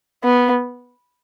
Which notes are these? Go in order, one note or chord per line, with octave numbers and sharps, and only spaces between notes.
B3